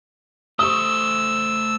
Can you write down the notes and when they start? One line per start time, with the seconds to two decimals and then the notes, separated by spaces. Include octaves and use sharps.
0.59 A3 C5 C#6 D#6 E6